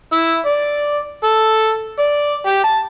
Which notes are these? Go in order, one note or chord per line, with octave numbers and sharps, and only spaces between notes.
E4
D5
A4
D5
G4
A5